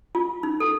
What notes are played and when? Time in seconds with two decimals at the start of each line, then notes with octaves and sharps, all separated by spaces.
0.15 F4
0.43 D#4
0.60 A4